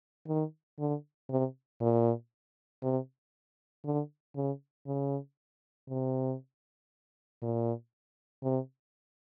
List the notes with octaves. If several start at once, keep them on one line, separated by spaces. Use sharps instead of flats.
D#3
D3
C3
A#2
C3
D3
C#3
C#3
C3
A#2
C3